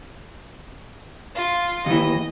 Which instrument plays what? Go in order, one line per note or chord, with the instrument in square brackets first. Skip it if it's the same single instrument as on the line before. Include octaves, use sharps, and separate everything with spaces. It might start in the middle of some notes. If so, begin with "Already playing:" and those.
[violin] F4
[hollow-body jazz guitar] D#2 E3 [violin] D#5